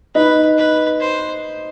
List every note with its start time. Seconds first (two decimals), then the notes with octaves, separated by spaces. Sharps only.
0.15 D#4 B4
0.58 B4
1.00 C5